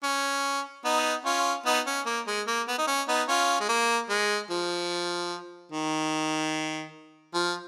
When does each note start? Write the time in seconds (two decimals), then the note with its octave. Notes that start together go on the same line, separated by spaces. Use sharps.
0.04 C#4
0.85 B3 D#4
1.25 C#4 F4
1.66 B3 D#4
1.86 C#4
2.06 A#3
2.27 G#3
2.47 A#3
2.68 B3
2.78 D#4
2.88 C#4
3.08 B3 D#4
3.28 C#4 F4
3.60 G#3
3.69 A#3
4.09 G#3
4.50 F3
5.72 D#3
7.34 F3